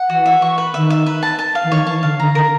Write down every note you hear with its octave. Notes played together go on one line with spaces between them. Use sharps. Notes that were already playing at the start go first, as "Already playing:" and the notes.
Already playing: F#5
E3 F#4
E5
C#6
B4
D#3 E5
E5
B4
A5
A5
F5
E3
D#3 C#5
E3 A5
D3 F5
D3 A#5
D3 A#4